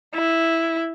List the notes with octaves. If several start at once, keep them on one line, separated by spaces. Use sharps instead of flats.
E4